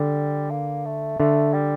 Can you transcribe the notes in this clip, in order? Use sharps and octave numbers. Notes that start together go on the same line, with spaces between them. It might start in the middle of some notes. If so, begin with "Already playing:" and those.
Already playing: D3 G3
A#3
A3
D3 A3
G3